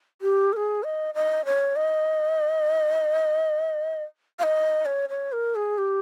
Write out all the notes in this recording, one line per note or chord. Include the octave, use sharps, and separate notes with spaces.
G4
A#4
G#4
D#5
D#5
C#5
D#5
F5
D#5
C#5
C#5
A#4
G#4
G4